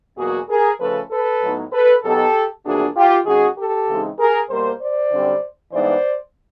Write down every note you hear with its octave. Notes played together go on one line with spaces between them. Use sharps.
E2 B2 F#3 A#3 F#4 G#4
G#4 A#4
C#3 F3 A3 C#4 A4 B4
A4 B4
A2 F#3 B3 D#4
A4 B4
B2 F#3 B3 D#4 G4 A4
E2 C3 F3 A#3 D4 F#4 G#4
F4 G4
D#3 G#3 C#4 F#4 G#4
G4 A4
C#3 E3 G#3 C4 D#4
G#4 A#4
B2 G3 A#3 A#4 C5
C5 D5
F#2 D3 G3 C4
G2 E3 G#3 B3 D#4 C5 D5